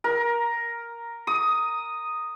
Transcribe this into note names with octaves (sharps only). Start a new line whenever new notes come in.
A#4
D#6